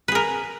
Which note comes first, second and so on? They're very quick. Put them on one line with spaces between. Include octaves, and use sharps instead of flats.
B4 G#4 A#4